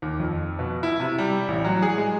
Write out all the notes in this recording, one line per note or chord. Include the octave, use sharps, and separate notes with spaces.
D#2
F2
B2
E4
C3
G3
A1
F#3
G#4
G#3